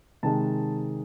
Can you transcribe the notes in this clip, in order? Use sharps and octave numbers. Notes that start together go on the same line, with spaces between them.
C3 D#3 G#3 A5